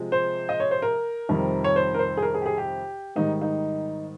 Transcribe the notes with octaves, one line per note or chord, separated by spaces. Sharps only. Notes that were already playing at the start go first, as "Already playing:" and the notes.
Already playing: C3 F3 G#3
C5
D#5
C#5
C5
A#4
F2 C3 D#3 G3
C#5
C5
A#4
C5
G#4
A#4
G#4
G4
G#4
G4
G#2 D#3 G3 D#4
D#4